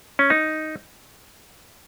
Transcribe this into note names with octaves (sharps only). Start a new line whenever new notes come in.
C#4
D#4